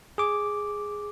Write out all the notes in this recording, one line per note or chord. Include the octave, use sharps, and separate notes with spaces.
G#4 D6